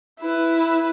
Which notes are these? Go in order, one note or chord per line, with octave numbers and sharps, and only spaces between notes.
E4 B4